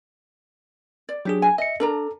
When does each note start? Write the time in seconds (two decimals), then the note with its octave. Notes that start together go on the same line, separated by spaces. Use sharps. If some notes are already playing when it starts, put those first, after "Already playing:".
1.09 D5
1.25 F#3 D4 G4 G#4
1.42 G#5
1.58 D#5 E5 C#7
1.80 D4 A4 A#4 A#5